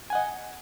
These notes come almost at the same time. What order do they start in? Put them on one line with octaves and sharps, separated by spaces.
G#5 F#5 D#5